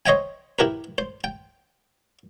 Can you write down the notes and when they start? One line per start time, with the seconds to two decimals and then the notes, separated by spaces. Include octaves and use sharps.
0.06 C5 C#5 D#5 E5 G5 G#5
0.59 E4 G4 A#4 B4
0.98 C5
1.24 G5